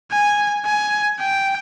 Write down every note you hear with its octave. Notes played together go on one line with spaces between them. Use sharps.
G#5
G#5
G5